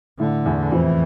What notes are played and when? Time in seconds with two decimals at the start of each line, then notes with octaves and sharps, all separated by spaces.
0.19 A2 D3
0.46 E2 E3
0.72 F2 E3 F3